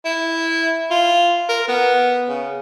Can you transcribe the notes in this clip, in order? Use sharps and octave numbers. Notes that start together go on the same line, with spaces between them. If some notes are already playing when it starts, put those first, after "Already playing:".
E4
F4
A#4
B3
C#3